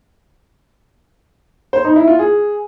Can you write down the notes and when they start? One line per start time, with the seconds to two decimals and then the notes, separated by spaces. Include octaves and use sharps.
1.73 C5
1.85 D#4
1.96 E4
2.08 F4
2.19 G#4